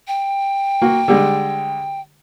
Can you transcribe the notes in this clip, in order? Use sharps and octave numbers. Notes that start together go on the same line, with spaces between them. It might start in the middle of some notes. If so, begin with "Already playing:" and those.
G5
A#3 F#4
D3 G3 G#3